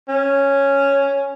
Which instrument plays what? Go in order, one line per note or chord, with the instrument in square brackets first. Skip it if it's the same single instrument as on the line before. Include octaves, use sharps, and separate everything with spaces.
[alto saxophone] C#4